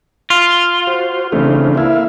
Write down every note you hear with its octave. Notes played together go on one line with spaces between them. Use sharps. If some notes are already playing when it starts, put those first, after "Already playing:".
F4
F#4 C5
C#3 E3 A3 C4 D4
A#3 E4 E5 F5